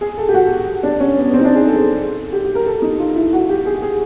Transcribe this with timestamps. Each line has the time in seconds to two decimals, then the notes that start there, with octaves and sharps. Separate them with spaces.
0.01 G#4
0.18 A4
0.29 G4
0.34 F#4
0.83 D4
1.00 C#4
1.17 B3
1.28 B3
1.34 C4
1.40 D#4
1.44 D4
1.55 G#4
1.67 A4
2.33 G4
2.45 G4
2.55 A#4
2.66 A4
2.82 D#4
2.99 F4
3.16 E4
3.33 F#4
3.49 G4
3.66 G#4
3.82 G#4